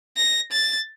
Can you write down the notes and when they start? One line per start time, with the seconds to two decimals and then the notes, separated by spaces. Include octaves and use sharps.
0.17 A#6
0.52 A6